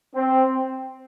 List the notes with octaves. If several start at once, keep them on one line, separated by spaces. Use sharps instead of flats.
C4